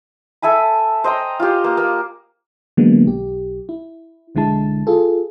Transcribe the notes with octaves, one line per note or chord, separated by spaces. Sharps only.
A4 E5 G#5 B5
C5 D#5 G5 A#5
F4 G4
A#3
A#3
D3 E3 F#3 G#3 A#3 B3
B1 G4
E4
B1 D3 G#3 E4 A5
F4 G#4 A4